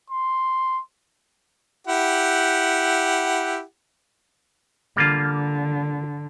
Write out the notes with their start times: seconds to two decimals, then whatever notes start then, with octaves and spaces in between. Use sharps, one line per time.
0.10 C6
1.87 E4 G4 F#5
4.97 D3 G3 A#3 F4